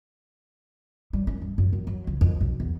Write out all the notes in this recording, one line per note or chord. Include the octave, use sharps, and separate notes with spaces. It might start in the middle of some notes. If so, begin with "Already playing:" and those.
G3
C#4
G2
F#2
F#2
F#3
C#2
F2
B1
E2